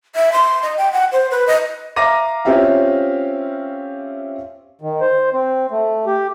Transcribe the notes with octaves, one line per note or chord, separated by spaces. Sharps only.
E5
C6
D#5
G5
F#5
C5
B4
D#5
E5 F5 A#5 D6 A#6 D#7
C4 C#4 F4 G4 E5 F5
D#3
C5
C4
A3
G4